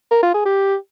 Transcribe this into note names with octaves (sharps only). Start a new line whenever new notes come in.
A#4
F4
G#4
G4